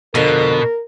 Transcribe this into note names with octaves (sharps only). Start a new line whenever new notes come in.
F2 B2 D3 A4 A#4